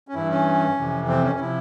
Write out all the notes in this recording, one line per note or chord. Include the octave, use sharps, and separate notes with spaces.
C#4
G2 E3 E4
C#4
F2 C3 E3
C4
C#4
C#4
C3 F3 E4